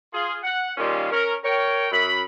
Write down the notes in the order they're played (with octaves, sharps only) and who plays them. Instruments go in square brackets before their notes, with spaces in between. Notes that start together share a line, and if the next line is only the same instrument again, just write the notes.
[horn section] F4 G#4
F#5
A#2 D#3 G3 C#4 F4 G#4
C#4 A#4
A#4 C#5 G5
F#2 B5